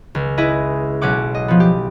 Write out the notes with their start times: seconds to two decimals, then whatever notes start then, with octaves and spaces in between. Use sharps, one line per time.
0.15 C#2
0.38 E4 G#4 B4 D#5
1.02 B1 C#4 F#5 D6
1.35 D#5
1.48 F3 B3
1.60 G4